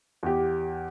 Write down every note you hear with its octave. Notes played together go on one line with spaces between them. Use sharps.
E2 G4